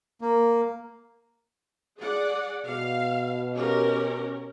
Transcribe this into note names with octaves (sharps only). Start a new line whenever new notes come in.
A#3
G#4 D5 F#5
B2 F5
C#4 G4 A#4